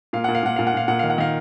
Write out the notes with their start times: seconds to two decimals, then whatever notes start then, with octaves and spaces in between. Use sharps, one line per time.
0.13 A#2 F5
0.24 A#2 F#5
0.35 F5
0.43 A#2 F#5
0.56 A#2 F5
0.67 F#5
0.74 A#2 F5
0.88 A#2 F#5
0.99 D#3 F5
1.10 F#5
1.18 D#3 F5